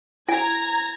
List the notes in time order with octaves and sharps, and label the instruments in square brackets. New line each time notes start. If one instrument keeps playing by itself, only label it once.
[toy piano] E4 G#5 [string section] A#5 G#6